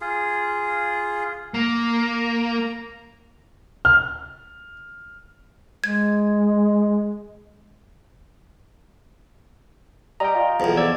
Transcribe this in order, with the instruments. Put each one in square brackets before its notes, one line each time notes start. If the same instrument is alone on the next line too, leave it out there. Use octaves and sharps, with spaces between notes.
[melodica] F4 G#4
[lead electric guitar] A#3 [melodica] A#5
[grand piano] F6
[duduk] G#3 [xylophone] G#6
[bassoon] G3 [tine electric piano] D#5 G5 [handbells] A#5
[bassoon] F4
[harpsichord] B1 E2 [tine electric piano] F3
[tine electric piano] B3 E6 G#6 [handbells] D5